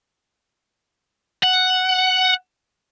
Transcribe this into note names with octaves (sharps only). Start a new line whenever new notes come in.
F#5